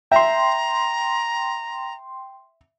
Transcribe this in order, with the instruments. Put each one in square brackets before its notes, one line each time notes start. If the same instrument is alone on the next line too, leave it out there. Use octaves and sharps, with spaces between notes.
[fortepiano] E5 [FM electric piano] G5 C6 [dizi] A#5